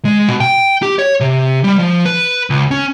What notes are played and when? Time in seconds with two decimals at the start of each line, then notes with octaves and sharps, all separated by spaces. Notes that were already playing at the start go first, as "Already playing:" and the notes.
0.05 G#3
0.28 B2
0.40 G5
0.83 G4
0.99 C#5
1.20 C3
1.64 G3
1.79 F3
2.05 B4
2.50 C#2
2.71 C#4